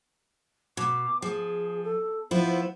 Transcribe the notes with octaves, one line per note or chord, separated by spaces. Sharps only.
B2 D6
F3 G#4
A4
F3 B3 E4 C5